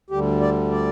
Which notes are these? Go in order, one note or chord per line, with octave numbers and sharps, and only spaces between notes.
D2 D3 G3 G4
D5
D5